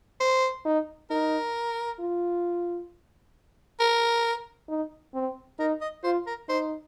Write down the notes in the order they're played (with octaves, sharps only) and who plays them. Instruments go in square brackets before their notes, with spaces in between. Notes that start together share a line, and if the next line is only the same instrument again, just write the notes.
[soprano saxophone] C5
[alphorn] D#4
[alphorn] D#4 [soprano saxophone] A#4
[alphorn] F4
[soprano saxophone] A#4
[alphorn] D#4
C4
[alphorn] D#4 [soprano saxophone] A#4
[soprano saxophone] D#5
[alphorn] F4 [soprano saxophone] C5
[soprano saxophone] A#4
[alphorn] D#4 [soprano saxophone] C5